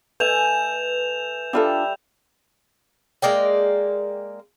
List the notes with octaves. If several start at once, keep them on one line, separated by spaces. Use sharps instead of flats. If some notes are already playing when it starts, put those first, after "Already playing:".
A3 B4 G#5 G6 E7 F7
G3 D4 F4 A4 E5
G#3 A#3 D5 G5